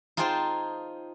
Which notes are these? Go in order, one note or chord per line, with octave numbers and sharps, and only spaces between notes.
D#4 F4 G#4 C5 G5 A5